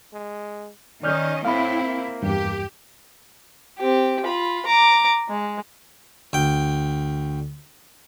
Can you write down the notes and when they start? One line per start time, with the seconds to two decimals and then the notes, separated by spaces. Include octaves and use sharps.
0.13 G#3
1.03 D#3 C#4 D5 D#5 F6 G6
1.45 A2 C4 E4 F5 B5
1.84 A#3
2.23 E2 G2 G4
3.78 C4 G4
4.25 F4 B5
4.66 A#5 D6
5.29 G#3
6.33 D2 G5